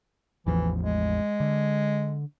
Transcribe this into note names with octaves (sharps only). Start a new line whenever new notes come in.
A1 E2 E3 F3
G#3
D3